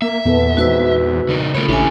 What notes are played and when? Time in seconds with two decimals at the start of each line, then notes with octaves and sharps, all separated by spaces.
0.02 A#3 E5
0.25 E2 A#2 B3 A4
0.57 G#3 C4 D#4 F#4 B4 E6
1.29 C#3 D#4 A#4
1.55 C#3 A3 F4 A#4 C#5 B5
1.69 A1 C#4 D4 E4 G4 A4 G#5